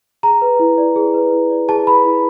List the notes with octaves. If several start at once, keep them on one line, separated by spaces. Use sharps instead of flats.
G#4 A#5
B4
E4
D5
G#4
B4
E4
D5
G#4 A5
B4 B5
E4